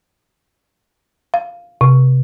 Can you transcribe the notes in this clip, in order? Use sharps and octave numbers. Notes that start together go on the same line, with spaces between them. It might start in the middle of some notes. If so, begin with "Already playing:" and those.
F5
C3